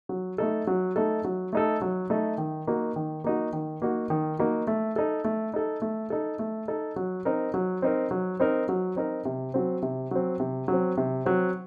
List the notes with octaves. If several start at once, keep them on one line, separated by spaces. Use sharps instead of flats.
F#3
A3 D#4 A4
F#3
A3 D#4 A4
F#3
A3 D#4 A4
F#3
A3 D#4 A4
D#3
A#3 D#4 F#4
D#3
A#3 D#4 F#4
D#3
A#3 D#4 F#4
D#3
A#3 D#4 F#4
A3
D#4 A4
A3
D#4 A4
A3
D#4 A4
A3
D#4 A4
F#3
C4 D#4 A#4
F#3
C4 D#4 A#4
F#3
C4 D#4 A#4
F#3
C4 D#4 A#4
C3
F#3 C4
C3
F#3 C4
C3
F#3 C4
C3
F#3 C4